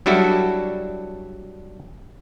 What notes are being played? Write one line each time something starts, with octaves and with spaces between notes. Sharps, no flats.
F#3 G3 D4 E4 F#4 A4